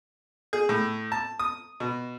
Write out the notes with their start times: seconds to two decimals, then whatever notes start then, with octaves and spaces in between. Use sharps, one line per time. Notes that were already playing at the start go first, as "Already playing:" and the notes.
0.53 G#4
0.69 A2
1.12 A5
1.39 D#6
1.80 B2